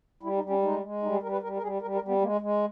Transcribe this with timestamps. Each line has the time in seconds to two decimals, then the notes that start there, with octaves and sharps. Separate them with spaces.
0.23 G3 E4
0.36 D#4
0.43 G3
0.50 C#4
0.62 G#3 D#4
0.83 G#3
1.03 G3 D#4
1.12 G#4
1.22 G3 A#4
1.32 B4
1.42 G3 A#4
1.57 A#4
1.62 G3 G#4
1.82 G3 A#4
1.95 A#4
2.02 G3
2.08 B3
2.22 G#3 A#3
2.41 G#3